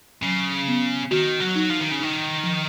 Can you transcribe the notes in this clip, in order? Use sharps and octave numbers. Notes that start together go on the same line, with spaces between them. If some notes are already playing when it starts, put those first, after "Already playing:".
C#3 F#3
B3
D#3 F#4
F#3
D#4
F3
D#3
C#3
D#3 D#4
F3